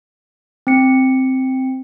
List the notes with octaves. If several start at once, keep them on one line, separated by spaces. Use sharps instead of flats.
C4 C#7